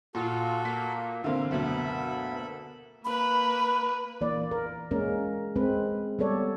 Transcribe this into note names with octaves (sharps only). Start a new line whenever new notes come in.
A#2 F4 F#4 A4
A#3 B6
D3 E3 A#3 C4 E4 F5
F#1 D2 B2 B3 A4 E5 B5
A#3 B4 B5
E3 A#3 D5
A#4
G#3 A#3 C#4 A#4
G#3 C4 B4
G3 B3 A4 C#5 D5